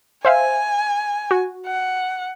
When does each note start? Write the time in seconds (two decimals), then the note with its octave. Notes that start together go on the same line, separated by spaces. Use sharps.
0.25 C5 E5 F5 G#5
1.31 F#4
1.67 F#5